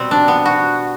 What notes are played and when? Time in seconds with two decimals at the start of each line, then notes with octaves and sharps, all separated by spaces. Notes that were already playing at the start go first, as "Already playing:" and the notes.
Already playing: B2 G3 C4
0.11 D4
0.28 B3
0.45 F#4